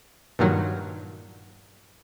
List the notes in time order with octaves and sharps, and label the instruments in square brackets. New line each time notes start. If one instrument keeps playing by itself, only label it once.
[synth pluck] G2 A#2 D#3 F#3